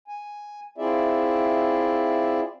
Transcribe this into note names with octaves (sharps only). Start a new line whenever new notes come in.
G#5
C4 E4 F4 G#4 D5 E5